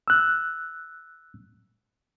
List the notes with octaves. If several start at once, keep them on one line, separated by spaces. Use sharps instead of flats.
E6 F#6